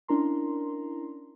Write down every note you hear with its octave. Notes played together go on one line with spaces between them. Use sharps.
C#4 D4 E4 A#4 A#5 C6